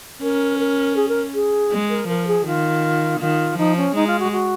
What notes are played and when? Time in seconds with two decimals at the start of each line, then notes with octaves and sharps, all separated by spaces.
0.23 C#4 A#4
0.60 A#4
0.96 G#4
1.09 A#4
1.34 G#4
1.72 G#3
1.90 A#4
2.08 F3 A#4
2.27 G#4
2.46 D#3 F4
3.20 D#3 F4
3.57 F3 D#4
3.77 C#4
3.95 G#3 D#4
4.07 F4
4.19 F#4
4.32 F#4